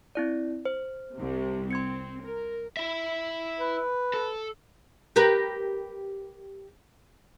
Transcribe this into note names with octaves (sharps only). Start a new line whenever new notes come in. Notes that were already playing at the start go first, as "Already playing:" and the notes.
C4 E4 D5
C5
C2 C3
C4 C6 G#6 C#7
A#4
E4 E5
B4
A4
G4 A#4 B4